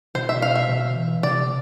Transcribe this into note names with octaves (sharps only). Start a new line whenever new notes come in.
B2 C5
E5
F5
E5
B2
E3
C3 D5